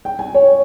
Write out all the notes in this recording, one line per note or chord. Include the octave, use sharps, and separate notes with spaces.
G5
G#5
C#5